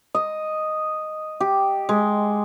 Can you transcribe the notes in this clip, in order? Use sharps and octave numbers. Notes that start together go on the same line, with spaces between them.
D#5
G4
G#3